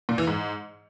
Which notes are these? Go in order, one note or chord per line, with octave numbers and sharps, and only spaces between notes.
A#2
E3
G#2